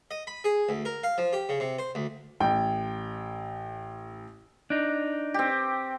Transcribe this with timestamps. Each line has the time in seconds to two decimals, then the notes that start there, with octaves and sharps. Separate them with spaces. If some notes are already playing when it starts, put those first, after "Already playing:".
0.11 D#5
0.27 B5
0.44 G#4
0.69 D2
0.85 A#4
1.03 F5
1.18 F3
1.33 G4
1.49 C#3
1.60 C3
1.79 C5
1.95 D2
2.40 A1 G5
4.70 D4 D#4
5.34 C4 G4